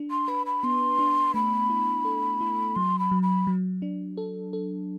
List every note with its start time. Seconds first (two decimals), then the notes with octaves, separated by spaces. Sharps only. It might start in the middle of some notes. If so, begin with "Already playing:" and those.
Already playing: D4
0.11 C6
0.28 B4 B5
0.46 B5
0.63 B3 C6
0.99 D4
1.34 A3 B5
1.70 E4
2.05 A4
2.41 E4
2.76 F#3 C6
2.99 B5
3.11 F#3
3.23 B5
3.47 F#3
3.82 D4
4.17 A4
4.53 A4